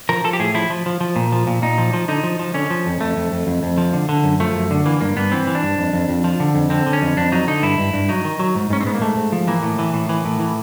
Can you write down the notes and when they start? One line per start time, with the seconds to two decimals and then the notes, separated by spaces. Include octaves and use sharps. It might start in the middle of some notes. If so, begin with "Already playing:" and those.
0.09 F3 A#4
0.24 F3 A4
0.33 G4
0.40 A2 G#4
0.54 F3 E4
0.70 F3
0.86 F3
1.01 F3
1.16 A#2
1.32 F3
1.47 A#2
1.62 A#2 D#4
1.78 F3
1.94 F3
2.08 D3 D#4
2.24 F3
2.39 F3
2.54 D3 C#4
2.70 F3
2.86 F2
3.01 F2 A3
3.16 F2
3.32 F2
3.47 F2
3.63 F2
3.78 F3
3.93 D3
4.09 D3
4.24 F#2
4.40 F3 A3
4.55 F#2
4.71 D3
4.86 E3 A#3
5.01 G2 A#3
5.16 G2 B3
5.32 E3 C4
5.47 E3
5.55 D4
5.63 G2
5.78 F2
5.93 F2
6.09 F2
6.24 F3
6.40 D3
6.55 F2
6.70 D3 C4
6.86 D3
6.93 C#4
7.02 F2
7.17 F2 D4
7.32 F#3 D#4
7.47 D3 D#4
7.63 G2 E4
7.78 G2
7.93 G2
8.09 F#3 D#4
8.25 D#3
8.40 F#3
8.55 G#2
8.70 G#2 C#4
8.81 C4
8.86 G#2 B3
8.95 A#3
9.02 G#2 A3
9.17 G#2
9.32 F3
9.47 E3 A#3
9.63 A2
9.79 E3
9.94 A2
10.09 E3
10.25 A2
10.40 E3